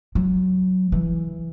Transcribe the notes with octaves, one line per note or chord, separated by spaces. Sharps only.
F#3
E3